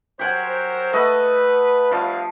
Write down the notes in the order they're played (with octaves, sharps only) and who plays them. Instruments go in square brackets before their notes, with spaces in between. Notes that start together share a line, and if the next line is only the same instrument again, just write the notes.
[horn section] F#3 A#4 C5 [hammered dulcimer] G4 F#5 G#5
[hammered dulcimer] A3 D#5 F#5 [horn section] B4
[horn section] G2 F5 [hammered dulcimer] F3